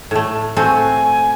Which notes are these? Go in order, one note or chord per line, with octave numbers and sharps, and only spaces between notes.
A2 A3
A3 C4 F#4 G#5